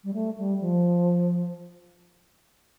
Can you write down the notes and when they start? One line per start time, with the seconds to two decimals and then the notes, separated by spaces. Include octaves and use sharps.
0.04 G3
0.14 A3
0.38 G3
0.61 F3